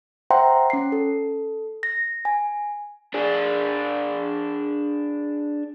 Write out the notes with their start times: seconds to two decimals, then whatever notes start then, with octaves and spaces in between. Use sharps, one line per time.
0.30 C5 E5 F#5 G5 A#5 C6
0.70 C#4 C7
0.92 A4
1.83 A#6
2.25 G#5
3.14 D4 G#4